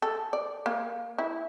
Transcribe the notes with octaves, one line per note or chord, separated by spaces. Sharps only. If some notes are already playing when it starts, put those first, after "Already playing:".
A4
D5
A#3
E4